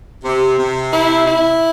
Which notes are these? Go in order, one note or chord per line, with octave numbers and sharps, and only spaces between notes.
C3
C3
E4
E4